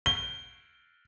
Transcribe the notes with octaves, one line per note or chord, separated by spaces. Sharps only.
G7